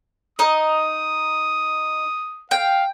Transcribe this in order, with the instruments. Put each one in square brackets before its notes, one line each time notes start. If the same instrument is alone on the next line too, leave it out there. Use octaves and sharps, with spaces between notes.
[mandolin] D#4 D#5 [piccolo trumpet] D#6
[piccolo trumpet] F5 [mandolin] G5